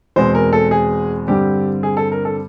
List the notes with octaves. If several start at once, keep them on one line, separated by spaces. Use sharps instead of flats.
E2 B2 G#3 C4 C5
A#4
A4
G#4
G2 D3 G3 C4 G4
G#4
A4
A#4
A4